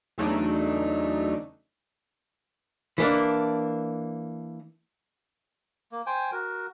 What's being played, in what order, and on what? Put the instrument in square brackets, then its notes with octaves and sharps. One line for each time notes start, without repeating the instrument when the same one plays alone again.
[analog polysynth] E2 C#3 F#3 A3 D4 D#4
[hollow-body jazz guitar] E3 A#3 D4
[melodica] A#3
C5 G5 G#5
F#4 A#4